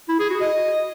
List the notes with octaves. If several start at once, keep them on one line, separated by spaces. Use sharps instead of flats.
E4
G#4
F#4
D#5